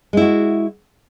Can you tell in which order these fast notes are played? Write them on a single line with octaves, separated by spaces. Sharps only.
G#3 E4 F#4